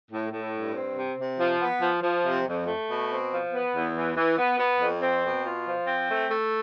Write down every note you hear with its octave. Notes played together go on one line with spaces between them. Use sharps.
A2
A2
G2
C4
C3
C3
F3
B3
F3
F3
C3
F2
A3
B2
C4
F3
B3
E2
E3
E3
B3
B3
F2
C4
B2
F4
F3
C4
A3
A3